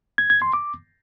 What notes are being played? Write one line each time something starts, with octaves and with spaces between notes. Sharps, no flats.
G#6
G#6
C6
D6